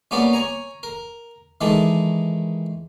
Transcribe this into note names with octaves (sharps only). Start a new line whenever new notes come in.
G3 A#3 B3 C#4 G4 D5
C#5 G#5 A#5
A#4
D#3 E3 G#3 G4 A4